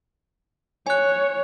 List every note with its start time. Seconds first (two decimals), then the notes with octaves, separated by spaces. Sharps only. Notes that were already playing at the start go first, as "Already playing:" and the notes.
0.87 C#5 G#5 F#6